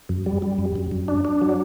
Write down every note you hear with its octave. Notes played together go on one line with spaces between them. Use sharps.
F#2
G3
G3
F#2
F#2
F#2
D4
D4
F#3